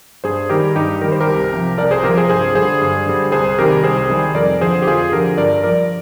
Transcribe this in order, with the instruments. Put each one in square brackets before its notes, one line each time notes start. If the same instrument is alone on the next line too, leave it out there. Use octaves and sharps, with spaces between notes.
[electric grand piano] G2 G#4 C5
D#3 G3 G4 A#4
G2 D#4 G4
D#3 G3 A#4
C5
G4 A#4
C2
C3 F3
C2 A#4 D5
G#4 C5
C3 F3 G4 A#4
G#4 C5
G2 G#4 C5
D3 G3 G#4 C5
G2
D3 G3
C2 G#4 C5
C3 D#3 G3 G4 A#4
C2 G#4 C5
C3 D#3 G3
F2 A#4 D5
D3 F3 G#4 C5
G4
F2 F4 G#4
D3 F3 G4 A#4
G2 A#4 D5
F3 A#4 D5